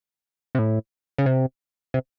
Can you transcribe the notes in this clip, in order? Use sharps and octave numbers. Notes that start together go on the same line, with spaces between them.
C3
A2
C#3
C3
C3